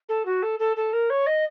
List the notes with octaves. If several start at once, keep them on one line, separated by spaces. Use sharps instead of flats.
A4
F#4
A4
A4
A4
A#4
C#5
D#5